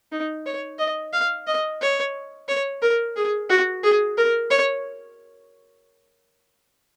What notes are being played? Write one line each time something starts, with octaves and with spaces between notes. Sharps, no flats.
D#4
C#5
D#5
F5
D#5
C#5
C#5
A#4
G#4
F#4
G#4
A#4
C#5